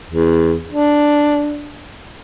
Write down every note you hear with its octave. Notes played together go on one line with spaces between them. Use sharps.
E2
D4